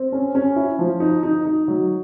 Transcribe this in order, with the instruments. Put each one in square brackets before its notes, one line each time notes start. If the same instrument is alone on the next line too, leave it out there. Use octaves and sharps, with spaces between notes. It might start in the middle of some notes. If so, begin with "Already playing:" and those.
Already playing: [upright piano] C4
C#4
C#4
E4
F3
D#4
D#4
D#4
F#3